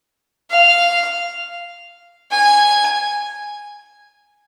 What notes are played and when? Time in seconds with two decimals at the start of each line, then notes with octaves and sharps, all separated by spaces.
0.50 F5
2.31 G#5